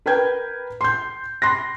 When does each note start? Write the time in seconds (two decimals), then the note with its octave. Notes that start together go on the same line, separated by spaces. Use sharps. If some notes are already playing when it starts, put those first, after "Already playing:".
0.06 A#4 B4 G5 B5 G6 G#6
0.81 C6 G6
1.42 B5 C6 F#6 A#6